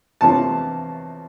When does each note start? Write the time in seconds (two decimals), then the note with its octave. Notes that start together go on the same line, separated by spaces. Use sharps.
0.21 E2 C3 F3 A#3 C#4 A5